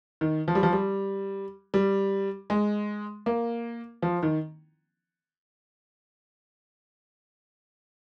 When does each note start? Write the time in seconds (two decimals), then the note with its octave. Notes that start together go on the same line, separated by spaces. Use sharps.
0.21 D#3
0.48 F3
0.55 G3
0.63 F3
0.73 G3
1.74 G3
2.50 G#3
3.26 A#3
4.02 F3
4.23 D#3